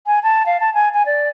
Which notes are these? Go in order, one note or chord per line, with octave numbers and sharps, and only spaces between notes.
G#5
A5
F5
A5
G#5
G#5
D5